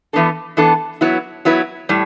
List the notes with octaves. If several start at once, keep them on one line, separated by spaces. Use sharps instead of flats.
E3 B3 D4 A4
E3 B3 D4 A4
F#3 B3 E4 B4
F#3 B3 E4 B4
A2 G3